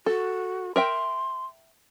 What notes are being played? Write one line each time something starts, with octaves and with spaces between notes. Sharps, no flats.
F#4 A4
A#4 E5 G5 C6